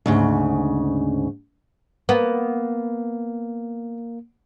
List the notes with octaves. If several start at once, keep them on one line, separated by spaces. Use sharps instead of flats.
D2 G#2 C#3
A#3 B3